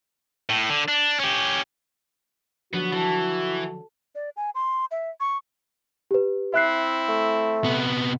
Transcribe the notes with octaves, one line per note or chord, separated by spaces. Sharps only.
A2
D3
D4
C#4 G4
D3 F3 F#3 B3 F#4
E3 A4
D5
G#5
C6
E5
C#6
G4 B4
C4 E4 E5 F#6 C7
A3
C3 B3